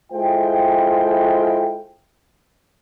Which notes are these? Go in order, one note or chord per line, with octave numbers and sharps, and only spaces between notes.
G#3 E4 F4 A4 C5 G5